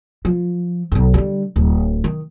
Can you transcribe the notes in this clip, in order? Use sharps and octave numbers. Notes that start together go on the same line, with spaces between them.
F3
D1 B1
D3 G3
D1
D#3